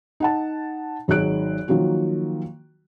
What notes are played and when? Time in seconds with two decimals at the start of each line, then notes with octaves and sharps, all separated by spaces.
0.20 D#4 F#5 A5
1.08 G#1 F#3 D#4 G#4 F#6 D7
1.68 D#3 F3 F#3 A#3 F#4